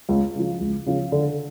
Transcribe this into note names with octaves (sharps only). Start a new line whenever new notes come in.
C#2
C#3 F3
C#2
C#3 F3
D3